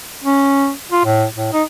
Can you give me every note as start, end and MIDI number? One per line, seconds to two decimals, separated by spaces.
0.24 0.71 61
0.91 1.03 65
1.05 1.25 45
1.36 1.52 45
1.53 1.63 63